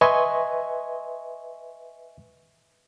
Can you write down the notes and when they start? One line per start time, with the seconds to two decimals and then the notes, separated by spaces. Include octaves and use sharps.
0.01 B4 D#5 E5 G#5 C6 C#6